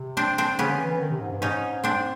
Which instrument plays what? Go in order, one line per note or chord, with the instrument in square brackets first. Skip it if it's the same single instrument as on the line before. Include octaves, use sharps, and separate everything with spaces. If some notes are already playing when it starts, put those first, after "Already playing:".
Already playing: [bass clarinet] C3
[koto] C4 D4
C4 D4
[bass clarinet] C#3 [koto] B3 C#4
[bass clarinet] D3
E3
E3
D#3
C3
G#2
G2
[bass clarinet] G#2 [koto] C#4 D#4
[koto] C4 D4